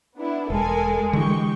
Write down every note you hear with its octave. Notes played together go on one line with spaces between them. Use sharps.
B3 D4 E4
E1 G#3 A4 A#4 G#5
D3 E3 G4 G5 C#6